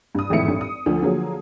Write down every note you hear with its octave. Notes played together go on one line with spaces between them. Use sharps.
G2 D#6
G#1 F2 A2 E3 E5 C#7
G2
D#6
D2 F3 D4
D3 F3 F#3 A#3 G#4 A#4